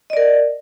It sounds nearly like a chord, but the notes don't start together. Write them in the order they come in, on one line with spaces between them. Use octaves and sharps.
D#5 D5 A#4